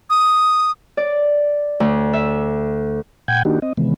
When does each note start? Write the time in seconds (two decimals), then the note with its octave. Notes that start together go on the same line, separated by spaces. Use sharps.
0.10 D#6
0.97 D5
1.80 D2
2.13 E5
3.28 A#2 F#5 G5 G6 G#6
3.45 D#3 A#3 D4 D#4 F#4 G4
3.62 C4 D#5
3.77 C3 D#3 E3 G#3 B3